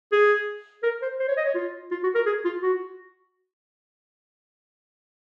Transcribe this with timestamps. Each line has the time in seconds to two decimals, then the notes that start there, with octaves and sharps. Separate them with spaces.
0.12 G#4
0.83 A#4
1.02 C5
1.19 C5
1.28 C#5
1.37 D#5
1.46 C#5
1.54 F4
1.91 F4
2.03 F#4
2.15 A#4
2.26 G#4
2.45 F4
2.63 F#4